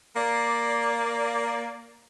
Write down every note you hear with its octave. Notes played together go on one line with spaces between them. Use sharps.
A#3 D5